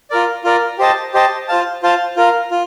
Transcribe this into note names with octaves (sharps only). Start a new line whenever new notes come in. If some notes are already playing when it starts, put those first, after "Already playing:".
F4 A#4 D5
F4 A#4 D5
G4 C5 D#5 A5
G4 C5 D#5 A5
F4 C5 F5 A5
F4 C5 F5 A5
F4 A#4 F5
F4